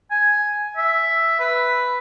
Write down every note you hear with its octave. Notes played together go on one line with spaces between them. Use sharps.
G#5
E5
B4